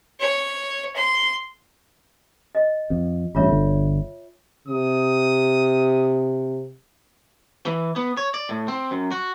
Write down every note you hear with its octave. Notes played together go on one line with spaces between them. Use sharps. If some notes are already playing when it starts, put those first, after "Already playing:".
C#5
C6
D#5
F2
A1 G2 F4 C#5 E5
G1 D3
C3 D#6
E3
B3
C#5
D5
A2
C4
F#2
F#4